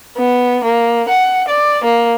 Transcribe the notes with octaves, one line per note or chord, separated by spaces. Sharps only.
B3
A#3
F#5
D5
A#3